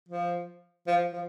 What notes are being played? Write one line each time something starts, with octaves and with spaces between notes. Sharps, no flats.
F3
F3
F3